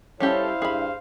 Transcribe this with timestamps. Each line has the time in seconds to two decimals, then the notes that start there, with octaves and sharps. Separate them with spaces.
0.20 G3 C#4 E4 G4 A4 C5 C#5 F5
0.62 G2 G#4 B5